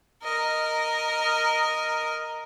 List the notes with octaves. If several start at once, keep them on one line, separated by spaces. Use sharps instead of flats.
A#4 D#5